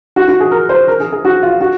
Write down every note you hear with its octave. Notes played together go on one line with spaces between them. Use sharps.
F#4
F#4
G#4
A#4
C5
A#4
G#4
G#4
F#4
F4
F#4